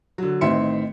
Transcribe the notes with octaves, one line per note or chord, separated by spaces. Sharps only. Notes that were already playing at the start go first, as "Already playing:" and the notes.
D3 F#3
A1 D#3 C4 E5 C6 C#7